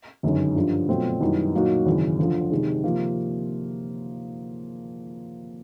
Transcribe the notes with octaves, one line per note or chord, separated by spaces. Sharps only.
G1 F#2 D#3 G#3 C#4
G2 D3 F3
B2 F#3 A3 C4 F4
F#2 D#3 G3 B3 E4
A#2 F#3 A#3 D#4 F#4
G#1 F#2 C#3 E3
D2 D3 F3
C3 D#3 G#3
C3 F3 A#3